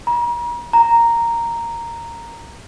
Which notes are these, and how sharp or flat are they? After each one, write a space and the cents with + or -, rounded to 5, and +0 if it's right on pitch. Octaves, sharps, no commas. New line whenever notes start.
A#5 +40
A#5 -5